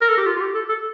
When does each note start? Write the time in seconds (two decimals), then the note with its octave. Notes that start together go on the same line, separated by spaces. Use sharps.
0.01 A#4
0.09 A4
0.18 G4
0.26 F4
0.37 F4
0.40 G4
0.55 A4
0.69 A4